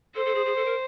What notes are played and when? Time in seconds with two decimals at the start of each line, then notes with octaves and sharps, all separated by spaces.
0.15 A4 C5
0.25 A4
0.35 G#4
0.46 G#4
0.56 A4
0.65 A#4